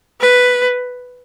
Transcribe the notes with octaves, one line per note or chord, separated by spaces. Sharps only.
B4